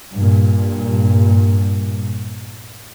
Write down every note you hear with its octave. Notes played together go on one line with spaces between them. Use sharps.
G2 A#2